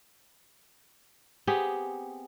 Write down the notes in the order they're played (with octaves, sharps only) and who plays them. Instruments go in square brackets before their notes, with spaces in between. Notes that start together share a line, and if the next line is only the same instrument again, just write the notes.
[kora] B3 C4 G4 G#4